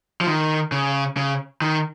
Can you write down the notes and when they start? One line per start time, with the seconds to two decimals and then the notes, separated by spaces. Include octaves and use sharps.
0.21 F3
0.27 D#3
0.72 C#3
1.17 C#3
1.62 D#3